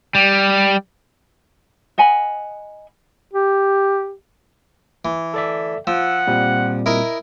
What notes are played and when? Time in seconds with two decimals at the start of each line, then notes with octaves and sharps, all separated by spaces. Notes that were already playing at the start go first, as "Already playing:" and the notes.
0.15 G3
1.98 D#5 F#5 G#5 B5
3.33 G4
5.05 E3
5.34 A4 D5 E5
5.87 F3 F#5 E6
6.27 A#2 G3 C4
6.86 E4 A#4 D#5